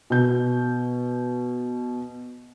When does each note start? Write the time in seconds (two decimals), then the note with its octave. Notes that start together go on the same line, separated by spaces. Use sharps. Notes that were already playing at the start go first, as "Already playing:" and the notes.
0.10 B2 G6